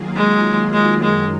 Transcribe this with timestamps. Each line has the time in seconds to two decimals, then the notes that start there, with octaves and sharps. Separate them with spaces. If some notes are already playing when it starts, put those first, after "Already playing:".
Already playing: D#3 F#3 A#3 F4 G#4
0.16 G#3
0.74 G#3
1.02 F#2 D#3 F#3 G#3